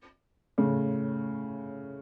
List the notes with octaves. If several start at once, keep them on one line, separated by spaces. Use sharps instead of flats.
A2 C#3